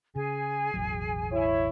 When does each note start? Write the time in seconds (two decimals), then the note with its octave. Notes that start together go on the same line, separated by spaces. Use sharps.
0.16 C#3 G#4 G#5
0.74 E1 A1 F#3
1.31 E4 C#5